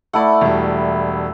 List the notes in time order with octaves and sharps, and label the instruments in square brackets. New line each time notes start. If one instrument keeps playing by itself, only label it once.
[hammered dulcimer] A3 E4 [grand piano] D5 F#5
[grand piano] E1 G3